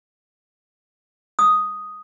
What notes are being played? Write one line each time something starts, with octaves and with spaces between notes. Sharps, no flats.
D#6